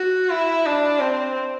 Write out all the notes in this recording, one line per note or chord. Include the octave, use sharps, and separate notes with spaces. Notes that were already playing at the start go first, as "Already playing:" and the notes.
Already playing: F#4
E4
D4
C4